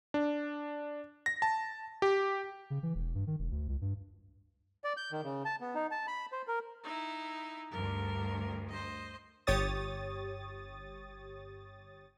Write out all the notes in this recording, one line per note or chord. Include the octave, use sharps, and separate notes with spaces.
D4
A#6
A5
G4
C#3
E3
E1
G2
D#3
E1
D2
C#2
G2
D5
G6
D#3
C#3
A5
B3
D#4
A5
B5
C5
A#4
D#4 E4
D2 G2 A#4
C5 D#5
G1 G4 C#5 D#6 A6